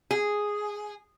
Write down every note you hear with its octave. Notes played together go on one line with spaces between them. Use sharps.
G#4